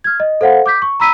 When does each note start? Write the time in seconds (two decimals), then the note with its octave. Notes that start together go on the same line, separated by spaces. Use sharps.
0.04 F6 G#6
0.20 D#5
0.41 A4 C5 F5 F#5
0.66 D6 G6 B6
0.82 C#6
1.00 A#5 B5 E6 B6 D#7